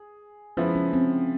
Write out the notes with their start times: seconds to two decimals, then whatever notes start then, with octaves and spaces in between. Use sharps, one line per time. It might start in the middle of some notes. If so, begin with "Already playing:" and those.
Already playing: G#4
0.57 F3 G#3 B3 C#4 E4
0.75 C#4
0.93 C4